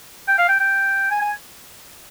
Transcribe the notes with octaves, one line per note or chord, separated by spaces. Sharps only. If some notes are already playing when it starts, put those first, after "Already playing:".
G5
F5
G5
G5
G#5
G#5